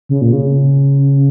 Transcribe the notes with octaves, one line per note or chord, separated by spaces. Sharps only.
C#3
A#2
C#3